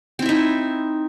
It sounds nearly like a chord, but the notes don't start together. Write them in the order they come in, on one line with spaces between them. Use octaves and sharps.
C4 E4 E5 D#4